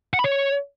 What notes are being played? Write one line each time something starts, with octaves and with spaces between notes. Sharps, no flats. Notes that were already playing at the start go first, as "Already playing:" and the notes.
F#5
B5
C#5